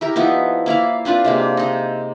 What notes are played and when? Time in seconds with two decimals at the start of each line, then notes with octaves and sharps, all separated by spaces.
0.01 E4 G4 A#4
0.16 F3 B3 D#4 E4
0.66 A#3 E4 D5 F5
1.05 C4 D4 F4 B4
1.25 C3 G#3 A#3
1.57 D#4 D#5